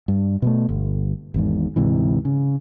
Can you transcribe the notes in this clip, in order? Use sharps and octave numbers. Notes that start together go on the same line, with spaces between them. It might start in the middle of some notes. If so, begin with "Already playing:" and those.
G2
B2 G#3 A3
G1
G#1 E2 G#2
D2 G#2 C3 E3
C#3